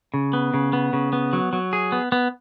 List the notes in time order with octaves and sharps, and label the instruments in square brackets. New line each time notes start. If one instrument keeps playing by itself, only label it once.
[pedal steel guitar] C#3
B3
C#3
B3
C#3
B3
F#3
F#3
G#4
B3
B3